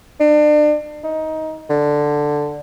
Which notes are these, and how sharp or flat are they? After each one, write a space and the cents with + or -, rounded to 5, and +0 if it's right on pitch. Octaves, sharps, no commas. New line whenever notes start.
D4 +35
D#4 +15
D3 +5